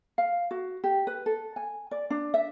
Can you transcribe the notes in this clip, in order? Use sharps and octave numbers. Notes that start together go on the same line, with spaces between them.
F5
F#4
G4
B4
A4
G#5
D5
D4
E5